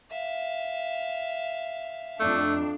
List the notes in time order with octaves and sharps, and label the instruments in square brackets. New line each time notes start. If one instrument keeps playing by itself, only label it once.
[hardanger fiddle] E5 F5
[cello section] F2 D4 [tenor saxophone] A3